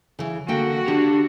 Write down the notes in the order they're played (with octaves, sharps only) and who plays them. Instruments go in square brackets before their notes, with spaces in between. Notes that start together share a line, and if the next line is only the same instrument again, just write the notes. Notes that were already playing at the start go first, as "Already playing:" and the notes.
[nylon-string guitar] C#3 E3
[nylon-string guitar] D3 A#3 G5 [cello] F#4
[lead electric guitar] D3 D4 [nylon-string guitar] G4